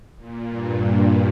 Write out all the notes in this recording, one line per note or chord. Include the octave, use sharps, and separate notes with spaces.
A#2
G2